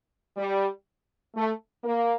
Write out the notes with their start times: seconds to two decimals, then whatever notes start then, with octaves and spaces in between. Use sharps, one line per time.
0.37 G3
1.35 A3
1.84 A#3